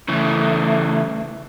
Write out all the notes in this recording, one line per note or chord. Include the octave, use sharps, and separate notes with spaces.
C#3 E3 A3